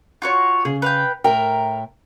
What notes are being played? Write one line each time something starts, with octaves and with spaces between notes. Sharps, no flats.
F4 F#4 C#5
C#3 G#4
B4 F5 G5
A2 A#4 E5 G5